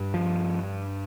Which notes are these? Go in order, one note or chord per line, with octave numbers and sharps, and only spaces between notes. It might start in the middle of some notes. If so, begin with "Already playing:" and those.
Already playing: G2
F3